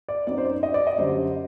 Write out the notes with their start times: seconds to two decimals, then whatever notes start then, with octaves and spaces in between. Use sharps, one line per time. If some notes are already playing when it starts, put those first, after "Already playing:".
0.09 D5
0.27 F#2 F#3 C4 D#4 D5
0.38 C5
0.45 D5
0.63 D#5
0.74 D5
0.87 D#5
0.98 F#2 D3 G3 C5